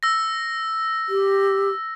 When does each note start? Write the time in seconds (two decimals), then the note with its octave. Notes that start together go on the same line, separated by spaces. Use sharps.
0.03 E6 A#6
1.09 G4